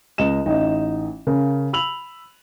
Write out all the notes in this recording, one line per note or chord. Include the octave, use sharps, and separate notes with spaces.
C#2 D#5 E7
A1 D#4 D#5
C#3 A#4
B5 E6 F7 F#7